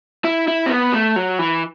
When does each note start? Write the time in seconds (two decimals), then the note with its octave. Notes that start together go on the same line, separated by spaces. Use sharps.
0.25 E4
0.48 E4
0.66 C4
0.70 B3
0.93 A3
1.16 F#3
1.39 E3